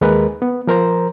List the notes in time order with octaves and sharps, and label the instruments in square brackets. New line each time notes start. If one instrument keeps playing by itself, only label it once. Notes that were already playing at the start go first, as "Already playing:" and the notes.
[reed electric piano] D#2 G#3 A#4 B4
B3
F3 A#4 C5 A#5